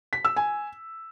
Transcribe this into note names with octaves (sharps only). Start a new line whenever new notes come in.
B6
E6
G#5